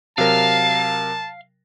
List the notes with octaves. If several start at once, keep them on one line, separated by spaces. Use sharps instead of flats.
C3 F#3 A#4 F5 A5